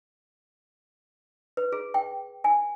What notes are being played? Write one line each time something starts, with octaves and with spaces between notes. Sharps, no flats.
B4
G#4
G5
G#5